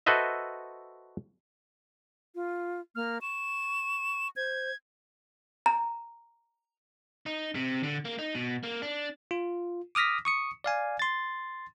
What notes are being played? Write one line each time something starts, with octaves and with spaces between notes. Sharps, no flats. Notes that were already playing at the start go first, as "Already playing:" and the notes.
F#4 A4 B4 C5 D#5 E5
F4
A#3 F6
C#6 E7
C5 G#6
A#5
D#4
C3
D3
A#3
D#4
B2
A#3
D4
F4
D6 D#6 F6 A#6 B6
C#6 D#6 C#7
D5 F5 G#5
C6 A6